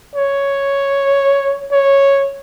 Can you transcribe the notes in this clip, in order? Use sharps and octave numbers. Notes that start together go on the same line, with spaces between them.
C#5
C#5